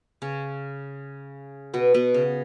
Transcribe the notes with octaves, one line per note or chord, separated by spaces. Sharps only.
C#3 C#4
B2 B3
B2 B3
C#3